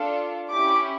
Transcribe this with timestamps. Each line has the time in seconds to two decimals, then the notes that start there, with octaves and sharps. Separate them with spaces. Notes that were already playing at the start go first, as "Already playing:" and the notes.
Already playing: D4 F4 A4
0.51 C#4 E4 G4 D6